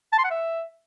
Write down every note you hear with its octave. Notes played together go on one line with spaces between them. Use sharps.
A5
C6
F#5
E5